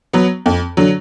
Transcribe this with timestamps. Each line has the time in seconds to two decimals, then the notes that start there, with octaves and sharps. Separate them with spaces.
0.13 F#3 B3
0.46 F2
0.77 D3 F#3